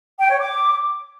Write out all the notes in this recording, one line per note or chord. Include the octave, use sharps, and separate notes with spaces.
G5
C#5
D6